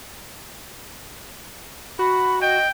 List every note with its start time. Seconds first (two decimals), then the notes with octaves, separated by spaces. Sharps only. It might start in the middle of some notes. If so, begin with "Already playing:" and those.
1.99 F#4 B5
2.42 D#5 G5